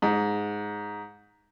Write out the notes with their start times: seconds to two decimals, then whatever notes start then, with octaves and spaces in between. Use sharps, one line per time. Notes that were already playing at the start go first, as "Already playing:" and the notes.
0.02 G#2